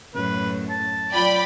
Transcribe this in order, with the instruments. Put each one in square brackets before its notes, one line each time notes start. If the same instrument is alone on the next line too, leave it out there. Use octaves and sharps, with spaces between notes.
[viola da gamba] F#2 A2 [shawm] B4
[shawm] A5
[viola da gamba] F#3 F4 [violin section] D5 G5 B5